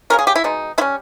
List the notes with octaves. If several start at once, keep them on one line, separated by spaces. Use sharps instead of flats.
C#3 G3 C#4 A#4
G#4
G4
E4
B2 G#3 D#4
G3 C#4 E4